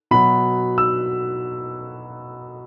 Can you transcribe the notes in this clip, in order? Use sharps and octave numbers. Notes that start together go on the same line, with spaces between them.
B2 F#3 B5
E6